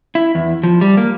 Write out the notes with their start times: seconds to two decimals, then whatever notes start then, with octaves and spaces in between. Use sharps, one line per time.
0.15 E4
0.35 E2
0.63 F3
0.81 G3
0.97 A#3